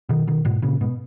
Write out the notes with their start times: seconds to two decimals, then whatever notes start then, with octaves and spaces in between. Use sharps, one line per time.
0.09 B2 D#3
0.27 B2 D#3
0.45 G#2 B2
0.62 A#2 C#3
0.81 G#2 B2